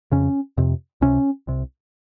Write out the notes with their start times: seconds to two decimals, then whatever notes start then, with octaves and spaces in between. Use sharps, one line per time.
0.12 F2 C#3 C#4
0.57 F2 C3
1.01 C#2 C3 C#4
1.47 C2 C3